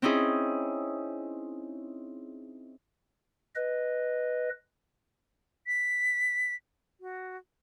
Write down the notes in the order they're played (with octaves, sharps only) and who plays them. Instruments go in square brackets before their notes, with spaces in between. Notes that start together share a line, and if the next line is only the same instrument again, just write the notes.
[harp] C4 C#4 D#4 E4 G#4
[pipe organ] B4 D#5
[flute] B6
F#4